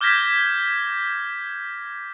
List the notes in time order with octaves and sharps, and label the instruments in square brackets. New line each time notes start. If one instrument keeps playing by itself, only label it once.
[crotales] D6 F6 G6 G#6 A#6 B6